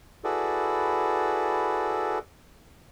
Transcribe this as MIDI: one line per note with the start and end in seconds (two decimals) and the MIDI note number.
0.24 2.19 64
0.24 2.19 66
0.24 2.19 68
0.24 2.19 69
0.24 2.19 71
0.24 2.19 74